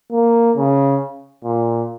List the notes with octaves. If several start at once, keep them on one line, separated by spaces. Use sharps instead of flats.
A#3
C#3
A#2